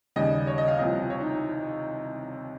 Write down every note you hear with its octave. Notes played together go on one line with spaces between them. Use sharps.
D#2 C#3 G3 D#5
C#5
D#5
F5
C2 C3 F3 D#5
C#5
D#4